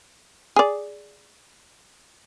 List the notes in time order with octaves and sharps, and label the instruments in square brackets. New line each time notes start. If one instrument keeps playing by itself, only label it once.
[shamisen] G#4 D5